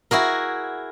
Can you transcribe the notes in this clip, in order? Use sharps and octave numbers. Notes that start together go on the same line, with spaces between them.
E4 F#4 G#4 A#4